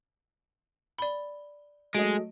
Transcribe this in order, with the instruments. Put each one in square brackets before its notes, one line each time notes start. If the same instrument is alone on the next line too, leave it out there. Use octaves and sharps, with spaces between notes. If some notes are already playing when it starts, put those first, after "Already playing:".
[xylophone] D5 B5 [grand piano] G7
[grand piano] F#3 A3 D#5 [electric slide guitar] G#3 [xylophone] D7